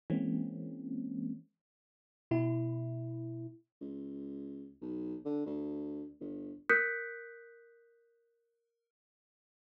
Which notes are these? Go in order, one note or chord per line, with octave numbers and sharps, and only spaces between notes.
E3 G#3 A#3 C4 C#4
B2 E4
C#2
B1
D3
D2
G1
A#4 D#6 F#6 G6 B6 C#7